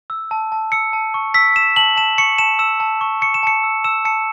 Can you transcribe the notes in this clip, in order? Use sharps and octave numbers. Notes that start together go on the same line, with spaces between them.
E6
A5
A5
E6 C#7
A5
C#6
E6 B6
E6 E7
A5 F#7
A5 E7
C#6 C#7
A5 E7
E6 E7
A5
C#6
C#6 C#7
E7
A5 C#7
E6
E6 E7
A5 C#7